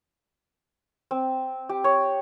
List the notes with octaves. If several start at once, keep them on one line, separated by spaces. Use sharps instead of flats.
C4
G4
C#5